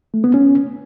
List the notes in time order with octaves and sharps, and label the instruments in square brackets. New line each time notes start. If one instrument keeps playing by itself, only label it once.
[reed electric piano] A3
B3
C#4